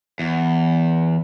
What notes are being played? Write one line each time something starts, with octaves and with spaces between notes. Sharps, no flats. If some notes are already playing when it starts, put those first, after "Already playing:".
E2